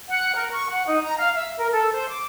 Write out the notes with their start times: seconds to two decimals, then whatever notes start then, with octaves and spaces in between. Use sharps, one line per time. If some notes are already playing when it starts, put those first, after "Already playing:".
0.09 F#5
0.36 A#4
0.52 C#6
0.70 F#5
0.86 D#4
1.04 A#5
1.18 F5
1.35 E5
1.57 A#4
1.73 A4
1.92 C5
2.09 D6